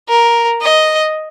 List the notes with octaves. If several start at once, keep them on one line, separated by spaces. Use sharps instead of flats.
A#4
D#5